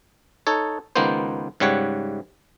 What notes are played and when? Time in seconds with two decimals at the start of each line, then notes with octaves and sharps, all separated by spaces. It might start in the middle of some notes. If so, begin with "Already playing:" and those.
0.47 D#4 A4 C#5
0.96 C#2 D#3 A#3 B3 C5
1.60 G#2 C#3 G3 C#5 F#5